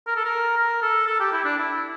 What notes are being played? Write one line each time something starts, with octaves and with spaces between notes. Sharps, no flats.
A#4
A4
A#4
A#4
A4
A4
G4
E4
D4
E4